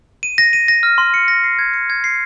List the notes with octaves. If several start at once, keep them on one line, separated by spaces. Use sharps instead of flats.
D#7
A#6
D#7
A#6
F6
C6
C#7
A#6
C7
G#6
C#7
G#6
C7